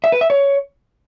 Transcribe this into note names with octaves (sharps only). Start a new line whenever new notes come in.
E5
B4
E5
C#5